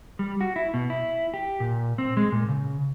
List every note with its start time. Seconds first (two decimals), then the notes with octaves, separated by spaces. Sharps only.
0.19 G3
0.41 F#4
0.56 E4
0.74 B2
0.90 E4
1.34 G4
1.60 A#2
1.98 C4
2.17 G#3
2.32 A#2
2.48 C#3